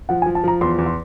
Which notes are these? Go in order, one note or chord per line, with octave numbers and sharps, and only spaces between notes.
F3 F#5
G#5
F3
A5
F3 A#5
E2 C6
E2
C6